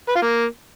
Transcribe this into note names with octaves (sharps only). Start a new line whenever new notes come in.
B4
F4
A#3